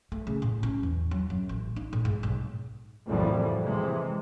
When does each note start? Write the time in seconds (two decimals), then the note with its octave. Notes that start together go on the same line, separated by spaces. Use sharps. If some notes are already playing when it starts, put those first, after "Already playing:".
0.12 A3
0.27 C#3
0.42 A2
0.63 C#4
0.83 E2
1.11 F#3
1.30 F#2
1.49 A1
1.76 D#4
1.93 A2
2.05 G#2
2.23 B1
3.07 C2 F2 A2 E3 F#3 G3
3.62 C3 E3 G#3